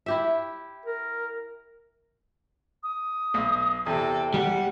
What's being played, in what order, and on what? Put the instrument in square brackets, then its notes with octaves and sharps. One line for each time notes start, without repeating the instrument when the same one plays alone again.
[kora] E4 G4 E5
[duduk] A#4
[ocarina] D#6
[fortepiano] B1
[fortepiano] E2 C3 [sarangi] A4 [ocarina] G5
[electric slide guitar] G3 [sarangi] F#5